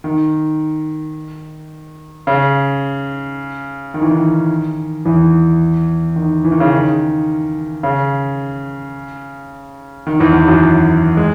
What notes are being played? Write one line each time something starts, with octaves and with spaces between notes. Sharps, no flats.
D#3
C#3
D#3
E3
D#3
E2 E3
D#3
E3
D#3
C#3
D#3
C#3
D#3
E2 E3
E2 E3
F#2 F#3
G#3